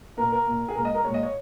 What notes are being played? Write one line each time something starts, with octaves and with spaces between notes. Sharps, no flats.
A#2 A#3 A#4
A#4
A#2 A#3
G#4
A#2 G#3 A#4
D#5
A#4
G#3 C#5
A#2
D#5
C#5